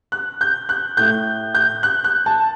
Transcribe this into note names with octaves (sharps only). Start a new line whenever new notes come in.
F#6
G6
F#6
A2 G6
G6
F#6
F#6
A5